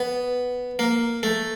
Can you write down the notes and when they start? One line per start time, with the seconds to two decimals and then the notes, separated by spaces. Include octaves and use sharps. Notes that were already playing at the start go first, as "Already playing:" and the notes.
Already playing: B3
0.79 A#3
1.23 A3